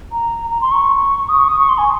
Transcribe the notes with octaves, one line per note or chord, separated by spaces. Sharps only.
A#5
A#5
C6
C#6
D#6
C#6
D#6
C#6
C6
G#5